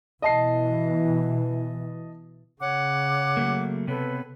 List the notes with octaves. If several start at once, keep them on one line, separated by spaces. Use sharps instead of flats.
B2 E3 D#5 A5 C7
C#3 C#5 F#5 D6
F#3 A3 A#3
C3 B3 A4 B4 C#5